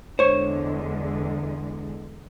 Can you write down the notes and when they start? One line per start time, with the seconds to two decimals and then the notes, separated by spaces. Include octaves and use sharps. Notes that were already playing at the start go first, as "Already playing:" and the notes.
0.19 E2 D3 G#3 C5 C#5